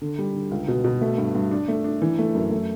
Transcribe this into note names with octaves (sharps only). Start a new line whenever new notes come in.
D3
G3
D3
C#2
B2
B2
A3
G2
G2
D4
A3
D4
E3
A3
F#2
A3